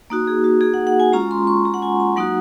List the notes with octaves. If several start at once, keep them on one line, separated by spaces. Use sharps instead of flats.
A#3 D#4 F#4
G#4
F#4
G#4
F#5
F#5
G#5
G#3 C#4 F4 A#5
C6
C#6
A#5
F#5
G#5
A#5
F#3 A#3 D#4 F#4 F#5